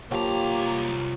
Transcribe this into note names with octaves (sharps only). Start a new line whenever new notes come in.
C2 F3 F#3 A#3 G4 G5 A#5